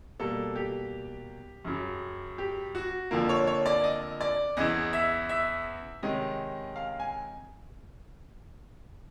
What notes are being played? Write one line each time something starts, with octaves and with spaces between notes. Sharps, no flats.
B2 G3 A#3 A4
G4
F#2 C#3 F#3
G4
F#4
F2 D3 F3 A#3
C#5
C#5
D5
D#5
D5
E2 C#3 E3 D#5
E5
E5
C3 D#3 G#3 C#4 D#5
F5
G#5